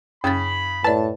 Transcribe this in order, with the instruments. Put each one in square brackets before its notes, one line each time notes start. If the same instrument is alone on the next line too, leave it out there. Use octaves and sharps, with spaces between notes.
[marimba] F#2 A6 [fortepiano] C#3 [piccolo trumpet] B5
[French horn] A2 [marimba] B4 D5 [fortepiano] A5